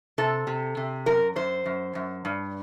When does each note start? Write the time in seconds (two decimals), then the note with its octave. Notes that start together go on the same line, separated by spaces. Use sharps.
0.18 C3 A4
0.47 C3
0.77 C3
1.06 F#2 A#4
1.36 F#2 C5
1.66 F#2
1.95 F#2
2.25 G2